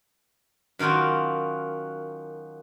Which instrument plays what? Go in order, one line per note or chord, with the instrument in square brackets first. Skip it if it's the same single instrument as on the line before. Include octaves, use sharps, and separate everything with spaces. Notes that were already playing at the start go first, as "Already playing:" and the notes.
[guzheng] F#2 D#3 D#4 F4 F#4